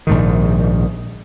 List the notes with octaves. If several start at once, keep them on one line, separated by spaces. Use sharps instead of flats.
A#1 G#2 D#3